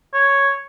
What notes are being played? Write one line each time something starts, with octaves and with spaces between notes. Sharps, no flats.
C#5